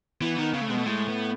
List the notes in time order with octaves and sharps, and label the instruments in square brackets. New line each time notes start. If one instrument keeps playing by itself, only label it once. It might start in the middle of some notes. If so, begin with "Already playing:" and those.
[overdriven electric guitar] E3 [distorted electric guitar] B3
[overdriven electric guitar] D#3
[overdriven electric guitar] C#3 [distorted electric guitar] B3
[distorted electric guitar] A3
[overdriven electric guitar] B2 [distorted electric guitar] G#3
[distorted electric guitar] A3
[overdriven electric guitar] A2 [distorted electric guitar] G#3
[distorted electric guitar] B3